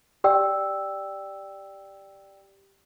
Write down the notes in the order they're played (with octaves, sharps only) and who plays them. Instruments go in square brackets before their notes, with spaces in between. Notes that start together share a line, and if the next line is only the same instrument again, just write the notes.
[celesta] G4 D5 G5 E6